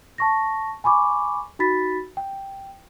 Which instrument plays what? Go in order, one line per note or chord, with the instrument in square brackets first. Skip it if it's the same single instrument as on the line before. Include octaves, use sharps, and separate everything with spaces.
[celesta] A5 C#6 A#6
G#5 B5 C#6 D6
D#4 F#4 B5 A6 B6
G5